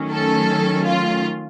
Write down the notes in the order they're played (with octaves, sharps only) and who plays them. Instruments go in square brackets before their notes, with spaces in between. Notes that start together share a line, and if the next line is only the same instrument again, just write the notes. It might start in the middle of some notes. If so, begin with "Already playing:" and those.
Already playing: [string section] D#3 F#3 A3 C#4
A4
F4